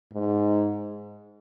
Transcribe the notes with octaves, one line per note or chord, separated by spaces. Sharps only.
G#2